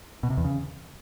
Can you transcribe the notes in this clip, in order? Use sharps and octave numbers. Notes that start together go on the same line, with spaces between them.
B2
C3
E2
C#3